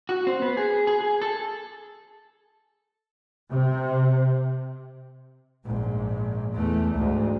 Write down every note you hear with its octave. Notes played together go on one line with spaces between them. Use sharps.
F#4
C4
B3
G#4
G#4
G#4
A4
C3
A#1 G#2
E2 A3
D2 G#2